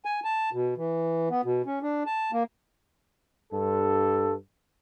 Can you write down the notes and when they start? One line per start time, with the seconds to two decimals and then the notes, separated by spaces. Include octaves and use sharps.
0.05 G#5
0.24 A5
0.52 B2
0.77 E3
1.30 B3
1.44 B2
1.66 C#4
1.82 D4
2.06 A5
2.32 A#3
3.52 G2 A4